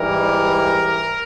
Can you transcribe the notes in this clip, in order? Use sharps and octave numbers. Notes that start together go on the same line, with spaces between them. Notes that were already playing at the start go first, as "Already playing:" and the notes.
Already playing: G#2 E3 G3 A#4